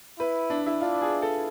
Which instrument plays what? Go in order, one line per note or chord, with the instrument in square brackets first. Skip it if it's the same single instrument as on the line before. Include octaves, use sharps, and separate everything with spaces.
[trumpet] E4 [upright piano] B4
[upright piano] D4
E4
[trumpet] D4 [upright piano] F4
[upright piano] G#4
A4